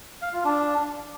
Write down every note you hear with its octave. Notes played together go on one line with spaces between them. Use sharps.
F5
F4
D4